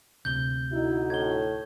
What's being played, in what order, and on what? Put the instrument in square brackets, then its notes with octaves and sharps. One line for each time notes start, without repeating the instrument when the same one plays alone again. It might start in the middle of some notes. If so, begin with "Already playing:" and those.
[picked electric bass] D2 C3 [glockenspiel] G6 G7
[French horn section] D3 D#4 F#4 [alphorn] E4
[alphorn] A2 [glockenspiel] G#6 G7